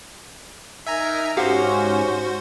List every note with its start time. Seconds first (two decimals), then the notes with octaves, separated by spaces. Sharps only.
0.87 D#4 A#4 E5 G#5 A#5
1.37 G#2 C#4 F#4 G4 C5 F5 F#5